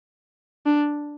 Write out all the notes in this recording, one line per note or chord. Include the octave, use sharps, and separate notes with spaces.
D4